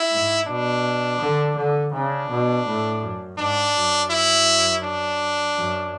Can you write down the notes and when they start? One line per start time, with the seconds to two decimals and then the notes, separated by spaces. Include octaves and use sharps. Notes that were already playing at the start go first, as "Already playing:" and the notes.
Already playing: E4
0.11 G#2
0.47 B2 D4
1.19 D3
1.56 D3
1.93 C#3 D4
2.29 B2
2.65 A2
3.01 F#2
3.38 G#2 D4
3.74 F#2
4.10 E4
4.83 D4
5.55 F#2